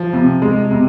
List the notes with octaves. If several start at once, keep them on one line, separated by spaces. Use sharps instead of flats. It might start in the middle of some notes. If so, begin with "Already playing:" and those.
Already playing: F3
C3
G#3
C3